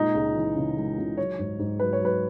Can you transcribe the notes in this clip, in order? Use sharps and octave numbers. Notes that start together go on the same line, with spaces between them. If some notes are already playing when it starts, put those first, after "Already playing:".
Already playing: A#2 G#3 D#4
C#2
E3
C#3
G#3
C#2
F#3 C#5
G#2
G#2
F#3 B4
C#5
F#3 B4